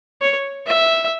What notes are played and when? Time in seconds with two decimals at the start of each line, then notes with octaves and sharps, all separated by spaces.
0.21 C#5
0.66 E5